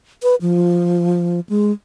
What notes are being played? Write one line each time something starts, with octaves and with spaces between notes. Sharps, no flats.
B4
F3
G#3